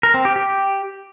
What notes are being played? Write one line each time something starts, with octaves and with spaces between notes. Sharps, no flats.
A#4
C4
G4
G4